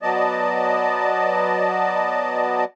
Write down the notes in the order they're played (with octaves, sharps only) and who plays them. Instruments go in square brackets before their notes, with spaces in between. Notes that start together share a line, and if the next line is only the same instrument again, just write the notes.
[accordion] F#3 B3 D5 D#5 A5